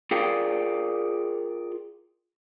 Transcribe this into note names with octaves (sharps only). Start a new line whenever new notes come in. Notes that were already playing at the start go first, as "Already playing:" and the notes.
F4 G#4 A#4 D5 F5 G5